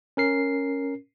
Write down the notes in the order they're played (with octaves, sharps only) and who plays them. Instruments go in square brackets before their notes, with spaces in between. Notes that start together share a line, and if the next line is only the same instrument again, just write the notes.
[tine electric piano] C#4 A#4 C7